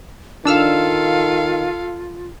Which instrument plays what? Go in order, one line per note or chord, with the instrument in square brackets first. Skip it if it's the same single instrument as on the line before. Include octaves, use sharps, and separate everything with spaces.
[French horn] D#3 [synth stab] D4 E6 F6 [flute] F4 [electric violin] A4 F5